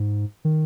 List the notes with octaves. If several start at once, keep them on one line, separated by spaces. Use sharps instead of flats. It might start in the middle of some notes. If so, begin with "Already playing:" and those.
Already playing: G#2
D#3